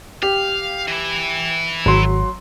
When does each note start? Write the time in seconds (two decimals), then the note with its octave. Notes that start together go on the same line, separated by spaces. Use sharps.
0.23 G4 F5
0.88 E3 E4
1.86 G#1 F#3 C6